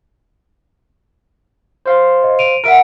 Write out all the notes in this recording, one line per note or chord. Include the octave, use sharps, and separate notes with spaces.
C5 F5 C6
D#5
D7 D#7 F7
A#4 E5 F#5 D7